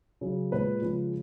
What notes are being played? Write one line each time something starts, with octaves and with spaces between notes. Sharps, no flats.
C#3 F#3
A#2 G#3 B4
C#3 F3 G#3